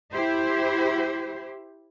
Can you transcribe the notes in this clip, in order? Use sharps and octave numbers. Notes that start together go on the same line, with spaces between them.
E4 G4 C5